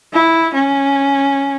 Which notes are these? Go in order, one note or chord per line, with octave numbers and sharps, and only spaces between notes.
E4
C#4